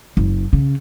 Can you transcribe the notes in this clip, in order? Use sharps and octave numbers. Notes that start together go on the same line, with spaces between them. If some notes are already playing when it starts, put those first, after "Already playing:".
F#1
C#3